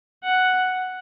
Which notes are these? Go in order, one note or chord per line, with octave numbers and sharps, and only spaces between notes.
F#5